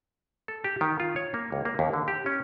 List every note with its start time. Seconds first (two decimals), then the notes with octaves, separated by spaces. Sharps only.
0.48 A4
0.64 G4
0.81 D#3
1.00 F4
1.16 C#5
1.34 A#3
1.52 C#2
1.65 A#3
1.79 D#2
1.93 D3
2.08 G4
2.26 C#4